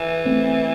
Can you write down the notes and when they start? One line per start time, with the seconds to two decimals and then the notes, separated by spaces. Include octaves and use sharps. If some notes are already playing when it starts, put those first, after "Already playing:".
Already playing: E3
0.26 A3 C4